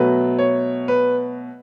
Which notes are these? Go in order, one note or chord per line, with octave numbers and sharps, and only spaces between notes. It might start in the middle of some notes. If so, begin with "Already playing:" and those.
Already playing: B2 F#3 A3 B4
C#5
B4